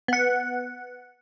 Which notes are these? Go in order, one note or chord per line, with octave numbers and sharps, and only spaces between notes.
B3 F#5